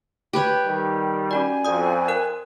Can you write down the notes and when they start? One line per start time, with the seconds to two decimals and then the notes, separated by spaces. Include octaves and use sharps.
0.33 G4 B4 C#5
0.66 D#3 G3
1.31 C#4 F#4 D5 G#5
1.65 F2 D5 D#6
2.08 A#4 F#6